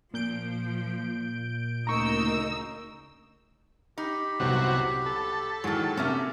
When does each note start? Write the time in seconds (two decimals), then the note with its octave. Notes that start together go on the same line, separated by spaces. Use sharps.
0.14 A#2 F3 G6 D7
1.87 D2 C#3 D#4 A#4 A#5 C#6 E6
3.98 D#4 G4 B5
4.40 C2 C3 F#3 B3 F#4
5.06 A4
5.64 G#2 D#3 E3 F#3
5.97 C3 A3 A#3 C#4 E5